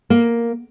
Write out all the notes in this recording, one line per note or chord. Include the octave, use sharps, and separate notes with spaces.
A#3